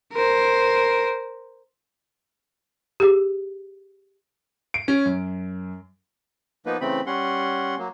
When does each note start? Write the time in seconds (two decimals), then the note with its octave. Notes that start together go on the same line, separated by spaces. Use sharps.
0.14 A#4 C5
3.00 G4 G#4
4.74 D7
4.88 C#4
5.06 F#2
6.66 F3 A#3 B3 D#4 B4
6.81 C#3 E3 A3 C4 B5
7.06 G3 C#4 F#5 C6
7.78 F#3 A#3